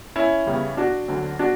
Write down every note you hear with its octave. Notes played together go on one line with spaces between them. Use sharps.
C#4 E4
E2 C#3 G3
D4 F#4
D2 D3 F#3
D4 F#4